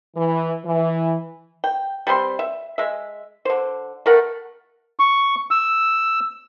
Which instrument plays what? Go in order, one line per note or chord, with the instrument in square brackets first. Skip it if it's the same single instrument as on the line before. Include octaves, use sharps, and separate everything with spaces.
[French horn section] E3
E3
[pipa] G5
G3 A3 C4 C6
E5
G#3 E5
D3 C5
A3 A#4 F#5
[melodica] C#6
E6